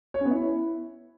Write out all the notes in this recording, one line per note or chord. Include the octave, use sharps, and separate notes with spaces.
C#5
C#4
B3
E4